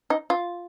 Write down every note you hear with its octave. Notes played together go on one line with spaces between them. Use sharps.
D#4
F4